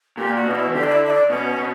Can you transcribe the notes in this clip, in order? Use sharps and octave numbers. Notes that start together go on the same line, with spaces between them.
A#2 G4
F#4
B2 D4
E4
E3
D3 G4
D4
E4
E4
D4
B2 C#4
B2